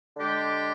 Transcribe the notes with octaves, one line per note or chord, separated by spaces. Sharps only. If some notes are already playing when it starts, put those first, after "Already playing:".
D3 G#3 D4 G4